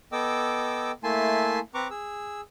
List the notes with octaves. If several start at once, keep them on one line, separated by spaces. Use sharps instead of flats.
B3 A4 D#5 G5 D6 E6
A3 A#3 E4 G#5 A5 C6
C4 B4 A#5 C#6 D6
G#4 E6